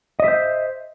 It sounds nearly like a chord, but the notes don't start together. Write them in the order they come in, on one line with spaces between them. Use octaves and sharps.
D#5 E5 C5